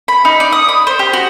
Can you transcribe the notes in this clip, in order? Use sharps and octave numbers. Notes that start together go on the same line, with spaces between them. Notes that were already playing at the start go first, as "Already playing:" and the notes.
B5
D#4
D5
D#6
B5
C5
G4
F#4